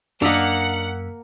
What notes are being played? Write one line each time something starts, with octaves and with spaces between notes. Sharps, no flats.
F#2 A#3 D4 A#4 D#5 F#5 E6 B6